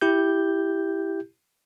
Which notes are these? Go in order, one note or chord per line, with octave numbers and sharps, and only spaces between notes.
E4 G4 G6